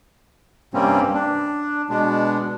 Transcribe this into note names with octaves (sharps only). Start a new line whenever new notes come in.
G2 C3 G3 A#3 C4 C#4
D4
B2 G#3 B3 D4